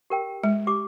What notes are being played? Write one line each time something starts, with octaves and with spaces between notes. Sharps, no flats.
G4 A#4 G5
G#3
G4 D6